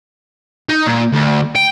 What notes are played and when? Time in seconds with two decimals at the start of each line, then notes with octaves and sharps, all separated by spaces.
0.69 D#4
0.86 A#2
1.12 D2
1.55 G5